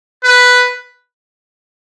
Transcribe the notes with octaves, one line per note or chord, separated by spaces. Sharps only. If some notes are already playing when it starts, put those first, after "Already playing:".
B4